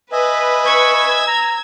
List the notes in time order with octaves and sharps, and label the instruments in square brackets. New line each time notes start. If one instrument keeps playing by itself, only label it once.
[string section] B4 [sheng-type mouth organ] D#5 E5 G#5
[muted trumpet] C#6 [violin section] E6 G#6
[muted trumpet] A#5